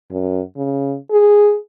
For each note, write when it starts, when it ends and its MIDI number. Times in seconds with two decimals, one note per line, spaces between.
0.11 0.41 42
0.57 0.96 49
1.11 1.57 68